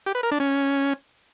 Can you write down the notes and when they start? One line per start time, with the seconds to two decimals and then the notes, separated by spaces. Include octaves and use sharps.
0.06 G4
0.15 B4
0.23 A#4
0.31 D4
0.40 C#4